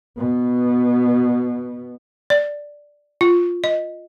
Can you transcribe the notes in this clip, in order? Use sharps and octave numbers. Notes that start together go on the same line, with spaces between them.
B2 B3
D5
F4
D#5